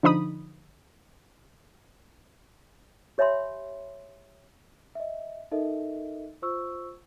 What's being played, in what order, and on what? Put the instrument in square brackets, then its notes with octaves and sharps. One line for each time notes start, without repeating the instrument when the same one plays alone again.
[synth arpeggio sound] D3 F3 D#4 B5 D#6
[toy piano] G4 C#5 E5 G#5 B5 C6
[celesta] D#5 E5
D#4 A4 A#4 D#5 E5
F4 C5 C#6 E6